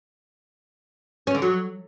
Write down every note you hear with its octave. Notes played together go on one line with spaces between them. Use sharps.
C#4
D3
F#3